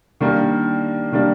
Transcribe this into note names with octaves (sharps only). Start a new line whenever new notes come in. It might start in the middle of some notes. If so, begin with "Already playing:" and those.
D#3 G3 A#3 D4
D#3 G3 A#3 D4